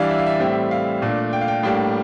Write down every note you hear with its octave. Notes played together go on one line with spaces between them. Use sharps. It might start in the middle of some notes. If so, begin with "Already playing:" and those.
Already playing: E3 G3 D4 D5 F5
E5
F5
E5
A2 G3 C4
F5
A#2 A3 D4
G5
F5
G5
A2 G3 A#3 D4 G5